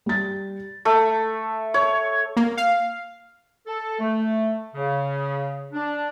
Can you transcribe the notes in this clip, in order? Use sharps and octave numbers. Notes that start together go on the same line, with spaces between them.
G3 A6
A3
C#5
A#3
F5
A4
A3
C#3
D4